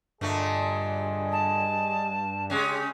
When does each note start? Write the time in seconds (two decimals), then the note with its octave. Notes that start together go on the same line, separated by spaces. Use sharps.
0.21 G2 A#2 D3 A3 G#4 D#5
1.32 A5
2.50 C#3 G#3 C#4 G4